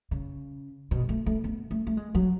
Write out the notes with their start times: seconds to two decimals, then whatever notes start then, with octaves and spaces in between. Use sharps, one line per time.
0.11 C#3
0.91 B2
1.09 A3
1.26 A3
1.44 B3
1.71 A3
1.87 A3
1.97 G#3
2.15 F#3